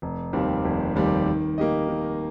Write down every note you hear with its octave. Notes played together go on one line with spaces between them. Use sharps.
F1
D#2 D#3 G3 C4
F1
D#2 D#3 G3 C4
D#3
A#3 G4 D#5
D#3